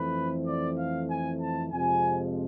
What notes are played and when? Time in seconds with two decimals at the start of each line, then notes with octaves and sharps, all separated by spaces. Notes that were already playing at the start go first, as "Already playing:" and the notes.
Already playing: F2 E3 A3 C4 B4
0.47 D5
0.78 F5
1.09 G#5
1.40 A5
1.71 F2 C3 F3 G#3 G#5